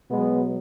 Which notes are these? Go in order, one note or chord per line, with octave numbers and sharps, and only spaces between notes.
B2 F#3 G#3 B3